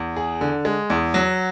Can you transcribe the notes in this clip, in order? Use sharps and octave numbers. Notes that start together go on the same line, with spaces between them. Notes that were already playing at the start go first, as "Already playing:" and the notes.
Already playing: E2
G#4
D3
G#3
E2
F#3